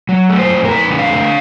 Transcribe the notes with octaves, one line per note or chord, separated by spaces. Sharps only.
F#3
A3
C5
F2
A#4
F2 B4
D3
F5
A3